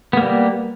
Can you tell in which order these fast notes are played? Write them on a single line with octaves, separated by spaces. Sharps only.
B3 A#3 G3